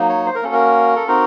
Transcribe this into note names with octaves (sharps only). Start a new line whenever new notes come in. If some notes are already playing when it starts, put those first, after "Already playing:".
Already playing: F#3 A#3 D#4
C#5
C5
A#4
A#3 C#4 F#4 A4
A#4
A4
C4 D#4 F#4 A#4